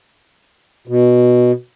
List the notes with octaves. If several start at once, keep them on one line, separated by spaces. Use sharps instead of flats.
B2